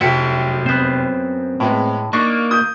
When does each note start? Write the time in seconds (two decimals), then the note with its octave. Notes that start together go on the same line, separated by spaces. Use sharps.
0.01 F1 F#2 E4 F#4 A4 E5 G5 C#7
0.66 B3 C4 C5
1.60 A2 G#3 B3 E4
2.13 A#3 D4 D#4 C#6
2.51 D#6 G6